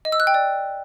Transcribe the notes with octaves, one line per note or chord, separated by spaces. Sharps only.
D#5
E6
F#6
G5
D5